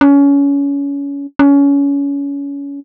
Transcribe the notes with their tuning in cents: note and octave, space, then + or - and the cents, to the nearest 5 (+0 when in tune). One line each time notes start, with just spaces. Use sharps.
C#4 +25
C#4 +25